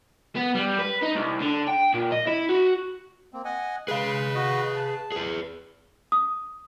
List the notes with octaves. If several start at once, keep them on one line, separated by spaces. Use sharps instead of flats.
B3
G3
B4
D#4
C2
D3
G5
A#2
D#5
E4
F#4
A#3 C4
D#5 F#5 G#5
G#3 G#4 B4 F5
F#4 D#5
A5
G#4 B4
D#6